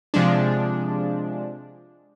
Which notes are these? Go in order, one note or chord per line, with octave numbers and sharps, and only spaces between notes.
C3 F3 G#3 D4